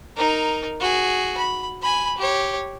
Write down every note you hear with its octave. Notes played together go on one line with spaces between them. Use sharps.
D#4 A#4
F#4 G#4
B5
G#5 B5
G4 C#5